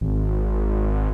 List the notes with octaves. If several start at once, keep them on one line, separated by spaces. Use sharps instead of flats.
G#1